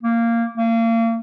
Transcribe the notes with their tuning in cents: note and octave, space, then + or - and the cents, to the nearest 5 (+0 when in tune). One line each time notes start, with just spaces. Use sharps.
A#3 -10
A#3 -35